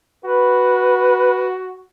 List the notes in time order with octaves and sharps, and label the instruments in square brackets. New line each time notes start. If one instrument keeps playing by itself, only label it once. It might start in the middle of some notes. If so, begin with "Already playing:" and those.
[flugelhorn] F#4 [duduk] B4